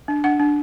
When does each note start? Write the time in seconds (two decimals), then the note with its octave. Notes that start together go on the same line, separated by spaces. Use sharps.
0.08 D4
0.24 D4 F#5
0.40 D4